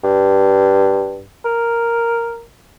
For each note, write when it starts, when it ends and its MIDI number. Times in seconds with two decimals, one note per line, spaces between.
0.03 1.24 43
1.45 2.43 70